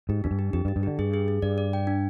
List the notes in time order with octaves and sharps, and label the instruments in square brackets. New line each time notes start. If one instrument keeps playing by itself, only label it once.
[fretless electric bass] G#2 [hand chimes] G4
[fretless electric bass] F2 [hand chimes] D4
[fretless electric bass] G2
[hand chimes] G4
[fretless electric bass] F2 [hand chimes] G4
[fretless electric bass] G2
[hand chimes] G4
[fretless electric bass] G2
[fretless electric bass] D3 [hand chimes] G4
[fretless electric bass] G2 [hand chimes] G#4
[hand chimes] G#4
G#4
[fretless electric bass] G2 [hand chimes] D5
[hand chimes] D5
G5
D4